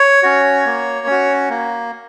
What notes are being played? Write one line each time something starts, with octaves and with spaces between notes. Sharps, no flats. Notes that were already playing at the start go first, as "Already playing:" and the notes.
Already playing: C#5
C#4 F#4
A#3
C#4 F#4
A#3